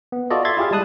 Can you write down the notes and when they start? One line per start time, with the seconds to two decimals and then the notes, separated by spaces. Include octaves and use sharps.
0.12 B3
0.30 F4 F#4 A4 D5 D#5
0.45 E5 C6 G#6 A6
0.57 E4 F4 G4 G#4 F5
0.71 G3 G#3 A5 D#6 F#6